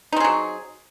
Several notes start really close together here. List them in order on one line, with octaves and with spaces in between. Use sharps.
D#4 C4 G#4 F#3